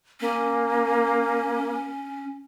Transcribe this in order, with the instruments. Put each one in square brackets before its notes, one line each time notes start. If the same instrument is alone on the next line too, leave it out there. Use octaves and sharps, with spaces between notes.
[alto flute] A#3 [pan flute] C#4